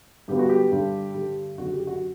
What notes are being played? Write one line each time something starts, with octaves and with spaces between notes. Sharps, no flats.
G2 D3 F#3 B3 G4
F#4
G4
G2 D3 G3
G2 D3 G3
F#1 F#2 D3 F#3 F#4
G4
F#4